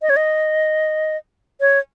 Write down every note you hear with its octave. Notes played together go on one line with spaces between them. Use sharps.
D#5
C#5
D#5
C#5